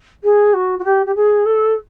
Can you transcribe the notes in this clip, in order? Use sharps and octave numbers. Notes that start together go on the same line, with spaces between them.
G#4
F#4
F#4
G4
G4
G#4
A4